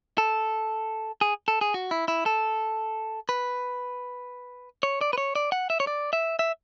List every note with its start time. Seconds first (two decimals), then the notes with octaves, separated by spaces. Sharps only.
0.18 A4
1.21 G#4
1.48 A4
1.61 G#4
1.74 F#4
1.91 E4
2.08 E4
2.26 A4
3.29 B4
4.83 C#5
5.01 D5
5.13 B4
5.18 C#5
5.35 D5
5.52 F#5
5.70 E5
5.80 C#5
5.87 D5
6.13 E5
6.39 E5